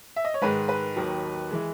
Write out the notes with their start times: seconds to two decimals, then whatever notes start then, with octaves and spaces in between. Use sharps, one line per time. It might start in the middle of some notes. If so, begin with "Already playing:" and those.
0.16 E5
0.25 D#5
0.34 C#5
0.42 G#2 D#3 G#3 B4
0.69 B4
0.96 D#2 D#3 F#3
1.51 E3 G#3